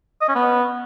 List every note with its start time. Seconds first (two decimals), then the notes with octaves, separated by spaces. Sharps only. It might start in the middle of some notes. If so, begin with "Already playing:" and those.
0.21 D#5
0.28 C#4
0.35 B3